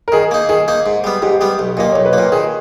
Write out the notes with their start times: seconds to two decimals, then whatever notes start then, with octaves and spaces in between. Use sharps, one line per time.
0.08 A#4
0.12 D#3 G#4
0.31 A#3 D#4
0.49 D#3 G#4
0.68 A#3 D#4
0.86 G#2
1.04 G3 B3
1.22 G#2 G4
1.41 G3 B3
1.59 B1
1.77 A#2 A#3 D#5
1.92 B1 C#5
2.06 B4
2.13 A#3
2.18 A#2 A#4
2.32 D#3 G#4